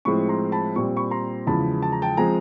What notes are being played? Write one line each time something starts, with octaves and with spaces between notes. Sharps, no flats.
A2 F3 G#3 C4 B5 C#6
A#5 C6
A5 B5
A#2 G3 C4 C#6
B5 C#6
A#5 C6
E2 C#3 F3 G#3 A5 B5
A5
A#5
G5 A5
F3 G#3 C4 G#5 A#5